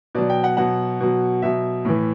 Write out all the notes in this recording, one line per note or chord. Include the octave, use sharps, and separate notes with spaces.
B2 F#3 D5
G5
F#5
B2 F#3 F#5
B2 F#3
B2 F#3 E5
A2 E3